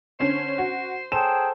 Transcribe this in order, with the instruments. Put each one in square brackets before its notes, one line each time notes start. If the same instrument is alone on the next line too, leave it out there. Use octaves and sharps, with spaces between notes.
[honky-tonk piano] D3 C#4 [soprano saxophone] C5
[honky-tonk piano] F#4
[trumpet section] G#4 G5 [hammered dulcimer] A4 C5 G#5 [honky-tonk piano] E7